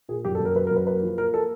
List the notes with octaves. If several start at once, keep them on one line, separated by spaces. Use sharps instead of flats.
A#2 G#4
F#2 G4
A4
F#2
A#4
F#2 B4
A#4
F#2
B4
A#3 B4
F3
A#3 A#4
A#3 A4